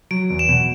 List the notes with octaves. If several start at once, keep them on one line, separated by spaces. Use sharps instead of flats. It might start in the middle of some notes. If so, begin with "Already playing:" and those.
F#3 D7
E2
E7
B2